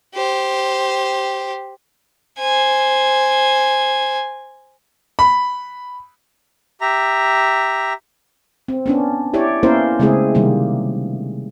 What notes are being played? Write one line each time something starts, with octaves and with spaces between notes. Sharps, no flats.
G4 C5
C5 G#5
B5
G4 E5 A#5
C4
B3 C#4 D4
E4 G4 C#5 D5
A#3 B3 C#4 E4 A#4 C5
C#3 G#3 A3 C4 E4 G#4
C3 D#3 G3 A#3